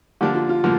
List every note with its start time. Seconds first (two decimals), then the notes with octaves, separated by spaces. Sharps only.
0.21 D3 F3 A#3 D4 G4
0.35 F4
0.49 F4
0.64 D3 F3 A#3